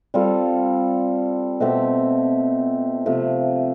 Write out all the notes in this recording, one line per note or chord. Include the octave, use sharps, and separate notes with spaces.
G3 C4 F4 A4
B2 A3 C4 G4
C3 F3 A3